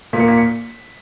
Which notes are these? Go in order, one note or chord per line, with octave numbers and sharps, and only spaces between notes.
A#2 A#3 B6
C#7
B6
C#7